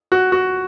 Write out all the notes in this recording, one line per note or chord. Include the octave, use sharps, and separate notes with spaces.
F#4
F#4